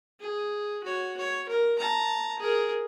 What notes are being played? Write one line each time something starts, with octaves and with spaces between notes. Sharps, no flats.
G#4
F#4 C#5
C#5
A#4
A5 A#5
G#4 A#4